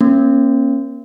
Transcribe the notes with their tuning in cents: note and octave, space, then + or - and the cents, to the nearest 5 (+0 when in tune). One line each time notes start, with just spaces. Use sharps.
A#3 +25 C#4 -20